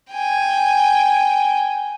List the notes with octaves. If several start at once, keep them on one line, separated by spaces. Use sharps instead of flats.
G5 G#5